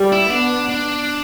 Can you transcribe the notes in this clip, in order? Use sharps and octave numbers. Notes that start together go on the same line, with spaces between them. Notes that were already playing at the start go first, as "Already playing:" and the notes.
Already playing: G3
E4
B3 D4
D4